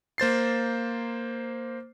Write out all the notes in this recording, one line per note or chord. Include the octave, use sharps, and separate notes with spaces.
A#3 C5 A6 C7